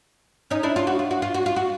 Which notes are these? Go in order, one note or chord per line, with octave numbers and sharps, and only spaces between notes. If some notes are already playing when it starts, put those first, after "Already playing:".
C#4 D#4
D4 E4
F4
F#4
F4
F#4
F4
F#4
F4
F#4